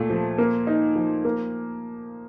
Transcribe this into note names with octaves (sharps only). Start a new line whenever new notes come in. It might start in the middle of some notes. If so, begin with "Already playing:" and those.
Already playing: A#2 A3
F3
A#3
D#4
F3
A#3